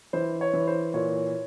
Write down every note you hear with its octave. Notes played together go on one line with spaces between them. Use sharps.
E3 C5
C#5
E3
C5
A#2 C#5